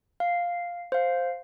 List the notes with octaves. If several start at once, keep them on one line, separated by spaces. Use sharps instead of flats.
F5
C5 F5